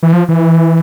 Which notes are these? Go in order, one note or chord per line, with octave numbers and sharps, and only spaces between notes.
E3
F3
E3